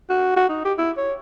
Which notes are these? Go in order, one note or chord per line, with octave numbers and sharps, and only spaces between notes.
F#4
F#4
D#4
G4
E4
C#5